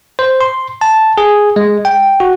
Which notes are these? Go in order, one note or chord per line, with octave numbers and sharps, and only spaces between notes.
C5
C6
A5
G#4
G#3
G5
F#4